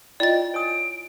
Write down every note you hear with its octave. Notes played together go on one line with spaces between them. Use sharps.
E4 F4 D5 D#5 G5 A6
C#5 G#5 D#6 D7